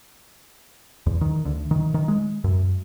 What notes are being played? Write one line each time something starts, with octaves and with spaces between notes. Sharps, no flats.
E2
D#3
D2
D#3
D#3
G#3
F#2